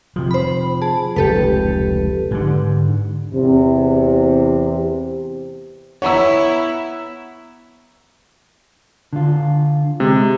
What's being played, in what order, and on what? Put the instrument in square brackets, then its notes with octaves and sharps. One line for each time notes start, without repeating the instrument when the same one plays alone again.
[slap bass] C3 F3
[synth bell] C5 B5
G#4 A5
[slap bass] F1 C#2 [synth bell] G4 A4 B4
[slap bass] G#2 D3
[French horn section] E2 C3
[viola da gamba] B3 E4 [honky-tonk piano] C#5 [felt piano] F#5 A#5 E6
[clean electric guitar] D3 F4
[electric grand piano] C3 [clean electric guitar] G#3